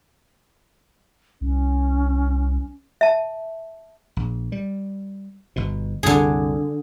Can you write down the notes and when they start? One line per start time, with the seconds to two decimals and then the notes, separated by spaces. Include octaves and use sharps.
1.41 C2 C#4
3.01 E5 A5
4.17 A#1
4.52 G3
5.56 G1 B2
6.03 C2 F#2 D3 G#4